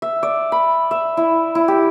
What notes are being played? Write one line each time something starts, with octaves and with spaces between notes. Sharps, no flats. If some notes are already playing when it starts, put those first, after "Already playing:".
E5
D5
B5
E5
E4
E4
G4